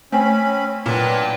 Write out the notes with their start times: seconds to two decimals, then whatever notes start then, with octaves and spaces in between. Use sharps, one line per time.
0.12 A3 C4 C#4 G#5 B5
0.86 A#2 F#3 D4 B4 G5 A5